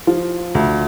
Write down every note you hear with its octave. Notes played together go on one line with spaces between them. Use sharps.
F3 F4
D2